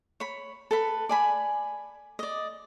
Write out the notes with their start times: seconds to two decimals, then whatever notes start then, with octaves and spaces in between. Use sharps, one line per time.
0.20 C#5 B5
0.71 A4 B4 B5
1.09 D5 G#5 B5
2.19 D5 D#5